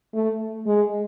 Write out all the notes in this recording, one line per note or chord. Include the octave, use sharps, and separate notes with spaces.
A3
G#3